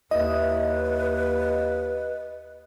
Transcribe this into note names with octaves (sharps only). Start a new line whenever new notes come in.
D#2 E4 B4 D#5 E5